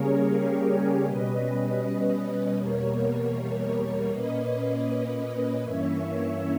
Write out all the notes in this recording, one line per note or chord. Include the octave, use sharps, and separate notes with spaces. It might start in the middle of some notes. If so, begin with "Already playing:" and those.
Already playing: C#3 G3 A#3 C#4 G#4 A#4 C#5
G4 A#4
A#4 C#5
B2 G3 C#4 B4 D#5
E2 B2 G3 A#3 A#4 C#5
A#2 A#3 C#4 B4 D#5
G2 E3 A#3 C#4 C#5 E5